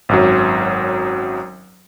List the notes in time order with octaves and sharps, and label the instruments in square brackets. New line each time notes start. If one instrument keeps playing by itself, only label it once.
[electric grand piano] G#1 F#2 F#3